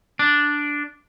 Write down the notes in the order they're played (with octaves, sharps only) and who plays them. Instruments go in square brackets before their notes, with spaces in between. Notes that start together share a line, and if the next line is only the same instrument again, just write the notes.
[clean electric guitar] D4